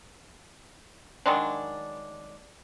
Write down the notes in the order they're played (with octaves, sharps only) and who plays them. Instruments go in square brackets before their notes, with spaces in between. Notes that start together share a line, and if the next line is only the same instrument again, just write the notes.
[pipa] D#3 F#3 G#3 D4